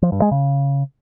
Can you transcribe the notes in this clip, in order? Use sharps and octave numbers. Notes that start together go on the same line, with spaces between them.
F3
G2
G#3
C#3